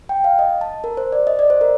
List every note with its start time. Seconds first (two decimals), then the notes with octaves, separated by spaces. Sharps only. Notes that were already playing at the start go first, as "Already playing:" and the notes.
0.09 G5
0.24 F5
0.39 D#5
0.61 A5
0.84 A#4
0.97 C5
1.12 D5
1.27 D#5
1.39 D5
1.50 C5
1.61 A#4